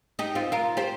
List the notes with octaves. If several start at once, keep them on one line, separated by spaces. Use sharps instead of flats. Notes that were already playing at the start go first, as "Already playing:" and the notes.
D#4 G4
C4 F4
F4 A#4
G4 C5